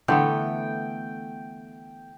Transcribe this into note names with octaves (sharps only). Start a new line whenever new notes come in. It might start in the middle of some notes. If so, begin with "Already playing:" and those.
D3 E3 A3 B3 G5